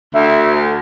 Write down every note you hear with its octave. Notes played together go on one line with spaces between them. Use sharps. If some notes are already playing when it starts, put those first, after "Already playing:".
D2 E5